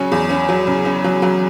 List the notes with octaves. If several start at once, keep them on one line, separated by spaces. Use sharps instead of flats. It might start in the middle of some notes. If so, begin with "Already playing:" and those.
Already playing: C#3 F#3 C#4
E2
C#4
F#3
C#3
C#4
F#3
F#3